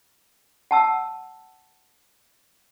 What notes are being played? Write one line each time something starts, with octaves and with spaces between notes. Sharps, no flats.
F#5 A5 E6